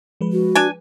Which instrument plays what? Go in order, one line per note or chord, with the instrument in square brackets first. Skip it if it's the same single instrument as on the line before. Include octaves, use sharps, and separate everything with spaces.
[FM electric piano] F3 G#3 B4
[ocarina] F#4
[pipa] D4 G#5